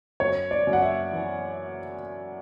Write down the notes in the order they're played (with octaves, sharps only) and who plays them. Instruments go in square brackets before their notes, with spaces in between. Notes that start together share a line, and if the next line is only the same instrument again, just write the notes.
[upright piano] F#2 C#5
D5
F#2
F#5
E5
E3